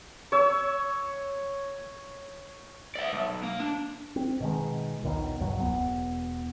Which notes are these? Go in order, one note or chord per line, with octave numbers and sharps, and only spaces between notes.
C#5 E6
D5 E5
B1
A#3
D4
C4
B2 D#3 G#3
A#1 D#2 B2 D#3
C#2 G2 F#3
E1 B3